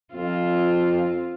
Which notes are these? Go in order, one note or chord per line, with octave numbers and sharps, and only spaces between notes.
F2 C4 F4